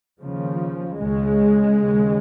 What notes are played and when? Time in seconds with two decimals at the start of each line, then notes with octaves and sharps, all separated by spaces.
0.21 D#2 C#3 F3
0.99 C#2 C#3 G#3
1.77 D#2 C#3